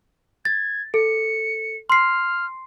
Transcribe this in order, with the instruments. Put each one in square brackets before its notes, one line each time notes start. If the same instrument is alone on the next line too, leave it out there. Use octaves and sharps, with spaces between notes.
[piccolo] G#6 [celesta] A6
[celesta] A4 [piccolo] C#7
[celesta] C6 C7 [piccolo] F6